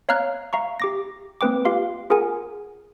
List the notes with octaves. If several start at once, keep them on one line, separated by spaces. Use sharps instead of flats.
C#5 F5 A#5 F6 F#6 G#6
E5 F5 A#5 C#6
G4 D6 A#6
A#3 C4 B4 G5 D6
F4 G4 F5 C6
F4 G#4 A#4 F#5 G#5